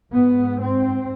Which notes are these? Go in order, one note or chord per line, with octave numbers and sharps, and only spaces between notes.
G#2 B3
C4